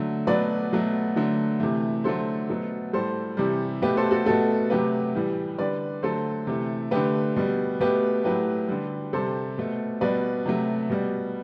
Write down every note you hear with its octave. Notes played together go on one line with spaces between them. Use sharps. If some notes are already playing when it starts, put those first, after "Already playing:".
Already playing: D3 F#3 A3
B2 F#3 A3 B4 D5
B2 F#3 A3
D3 F#3 A3
C3 E3 A3
D3 F#3 A3 A4 C5
B2 F#3 A3
A2 G3 A4 C5
C3 E3 G3
B2 A3 G4 B4
A4 C5
F#4 A4
B2 A3 F#4 A4
C3 F#3 A3 G4 B4
A2 E3 G3
D3 G3 B4 D5
D3 F#3 A3 A4 C5
C3 E3 A3
D3 A3 G4 B4
B2 G3
B2 A3 G4 B4
A2 F#3 A3 G4 B4
D3 G3
C3 G3 A4 C5
B2 A3
B2 G3 B4 D5
C3 F#3 A3
B2 G3